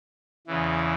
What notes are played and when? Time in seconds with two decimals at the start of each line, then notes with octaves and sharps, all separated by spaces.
0.47 E2 C#3 E3